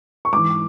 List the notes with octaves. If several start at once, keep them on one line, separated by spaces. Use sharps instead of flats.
C#6
G#2 E3 D6